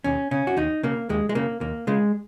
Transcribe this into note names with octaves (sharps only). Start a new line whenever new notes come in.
D#2 C#4
C#3 C#4
F#4
D#2 D#4
C#3 A#3
D#2 G#3
G#3
C#3 A#3
D#2 A#3
C#3 G#3